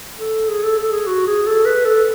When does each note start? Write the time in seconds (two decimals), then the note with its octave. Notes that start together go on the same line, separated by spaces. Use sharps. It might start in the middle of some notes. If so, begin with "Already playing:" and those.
0.19 A4
0.49 G#4
0.63 A4
0.78 A4
0.92 G#4
1.07 F#4
1.27 G#4
1.47 A4
1.65 B4
1.85 A4